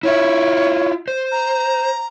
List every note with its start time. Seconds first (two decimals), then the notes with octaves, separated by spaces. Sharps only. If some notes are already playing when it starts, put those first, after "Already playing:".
0.03 E4 F4 C#5 E5
1.08 C5
1.31 A#5